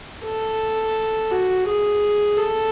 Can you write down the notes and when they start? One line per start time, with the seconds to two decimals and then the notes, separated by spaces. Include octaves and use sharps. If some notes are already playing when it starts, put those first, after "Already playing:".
0.24 A4
1.31 F#4
1.66 G#4
2.37 A4